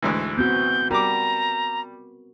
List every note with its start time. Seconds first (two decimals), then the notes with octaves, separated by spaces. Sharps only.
0.02 D2 G#2 E3
0.38 B3 C4 F#4 G6
0.91 G3 F#4 A#4 A#5 D6